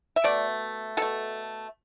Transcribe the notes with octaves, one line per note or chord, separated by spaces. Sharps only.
E5
B2 A3 D5
B2 A3 A4